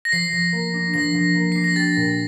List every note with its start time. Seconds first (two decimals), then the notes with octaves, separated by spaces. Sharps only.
0.05 A#6
0.12 F3 C7
0.33 F3
0.52 A#3
0.74 D4
0.94 F3 A#6
1.15 F3
1.35 A#3
1.52 D4 C7
1.64 A#6
1.76 G4 A6
1.96 A#2